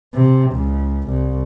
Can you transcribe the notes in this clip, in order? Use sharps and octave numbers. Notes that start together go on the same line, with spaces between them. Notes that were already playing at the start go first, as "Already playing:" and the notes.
C3
C#2
C2